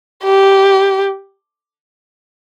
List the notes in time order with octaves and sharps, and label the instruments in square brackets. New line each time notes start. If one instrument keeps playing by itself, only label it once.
[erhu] G4